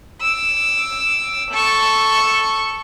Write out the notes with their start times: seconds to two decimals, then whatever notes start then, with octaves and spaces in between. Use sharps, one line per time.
0.21 D6 E6
1.51 A4 C#6